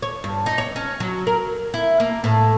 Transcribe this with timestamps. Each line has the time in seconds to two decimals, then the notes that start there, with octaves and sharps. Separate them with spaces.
0.02 C#5
0.24 G2
0.46 D#4
0.58 C#5
0.76 C#4
1.00 F#3
1.27 A#4
1.74 E4
2.00 A#3
2.24 A2